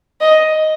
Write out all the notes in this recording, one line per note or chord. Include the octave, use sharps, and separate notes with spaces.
D#5